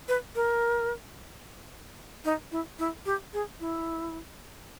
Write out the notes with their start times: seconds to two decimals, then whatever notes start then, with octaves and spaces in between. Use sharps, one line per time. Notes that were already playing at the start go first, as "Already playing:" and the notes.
0.08 B4
0.35 A#4
2.25 D#4
2.52 E4
2.79 E4
3.06 G4
3.33 G#4
3.60 E4